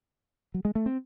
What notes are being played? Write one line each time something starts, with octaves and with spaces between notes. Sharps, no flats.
F#3
G#3
A3
C4